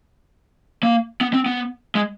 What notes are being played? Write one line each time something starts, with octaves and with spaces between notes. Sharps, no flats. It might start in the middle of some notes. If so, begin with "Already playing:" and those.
A#3
B3
C4
B3
G#3